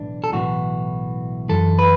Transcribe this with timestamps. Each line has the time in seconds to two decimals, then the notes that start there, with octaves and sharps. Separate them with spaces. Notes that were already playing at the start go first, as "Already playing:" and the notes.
Already playing: B1 A2 E3 D4
0.24 A4
0.33 B1 A2 E3 F#4
1.49 F#2 E3 A4
1.79 B4